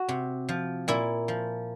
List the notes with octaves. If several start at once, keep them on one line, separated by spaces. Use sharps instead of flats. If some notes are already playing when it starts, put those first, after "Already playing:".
Already playing: F#4
C3
F3
A#2 E4
F3